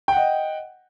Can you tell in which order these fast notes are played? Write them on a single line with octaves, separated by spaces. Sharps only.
G5 F#5 D#5